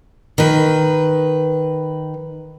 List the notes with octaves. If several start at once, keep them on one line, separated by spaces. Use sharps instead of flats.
D#3 B4